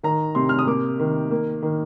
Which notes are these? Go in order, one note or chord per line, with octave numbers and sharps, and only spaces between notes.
D#3 A#5
C3 C6
F6
D#6
A#3 D6
D#3
A#3
D#3